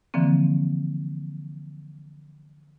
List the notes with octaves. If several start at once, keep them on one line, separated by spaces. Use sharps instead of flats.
D3 E3 F3 A#3 C4